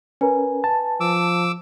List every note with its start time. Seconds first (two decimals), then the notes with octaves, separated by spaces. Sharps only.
0.21 C#4 A#4 B4 G#5
0.64 A5
1.00 F3 D6 E6